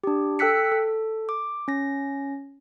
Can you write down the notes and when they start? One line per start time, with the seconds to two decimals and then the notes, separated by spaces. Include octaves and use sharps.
0.04 D4 G4
0.39 A4 G5 E6 F#6 B6 C#7
0.72 A4
1.29 D6
1.68 C#4 A#6